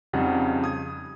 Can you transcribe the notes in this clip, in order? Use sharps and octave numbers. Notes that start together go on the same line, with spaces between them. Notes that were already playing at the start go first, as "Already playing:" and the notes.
F2 C#3 G3 D#4 F#5
D#6 G#6